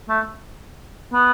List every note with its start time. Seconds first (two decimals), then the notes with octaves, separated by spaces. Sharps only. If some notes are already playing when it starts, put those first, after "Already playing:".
0.09 A3
1.13 B3